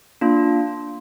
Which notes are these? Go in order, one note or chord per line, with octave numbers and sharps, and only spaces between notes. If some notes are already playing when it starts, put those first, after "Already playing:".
A#3 D4 F4